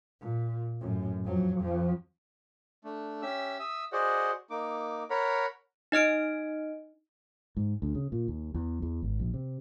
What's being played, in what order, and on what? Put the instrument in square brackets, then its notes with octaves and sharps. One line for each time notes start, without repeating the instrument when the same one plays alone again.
[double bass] A#2
F#2 A2
F2 F#3
F2 F3
[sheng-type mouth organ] A3 D4
C#4 G4 E5 E6
E5 D#6 E6
F#4 G#4 C5 D5 D#5 F#5
A#3 D#4 D6
A#4 C#5 F#5 A#5 B5
[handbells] D#4 D#5 F6 D7
[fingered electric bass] G#2
D2
C#3
A#2
D#2
E2
E2
G#1
A#1
C3